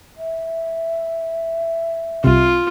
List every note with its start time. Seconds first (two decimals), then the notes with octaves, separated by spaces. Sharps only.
0.17 E5
2.24 C2 C3 F4